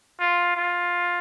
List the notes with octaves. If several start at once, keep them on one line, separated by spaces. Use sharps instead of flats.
F4
F4